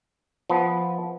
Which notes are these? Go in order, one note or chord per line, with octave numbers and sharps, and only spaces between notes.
F3 B3